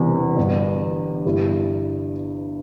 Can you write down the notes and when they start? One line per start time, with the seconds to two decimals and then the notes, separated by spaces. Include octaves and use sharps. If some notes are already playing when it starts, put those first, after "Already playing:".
Already playing: E1 E2 C3 E3 G3
0.37 G1 G2 G3
1.25 G1 G2 G3 E4